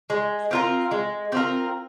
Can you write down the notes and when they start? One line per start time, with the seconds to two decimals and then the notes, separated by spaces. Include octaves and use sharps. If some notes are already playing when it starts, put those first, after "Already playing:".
0.10 G#3
0.51 C4 F4 A#4
0.91 G#3
1.32 C4 F4 A#4